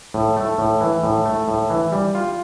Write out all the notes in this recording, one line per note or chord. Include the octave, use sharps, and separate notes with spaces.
A2
A3
A2
E3
A2
A3
A2
E3
G3
F4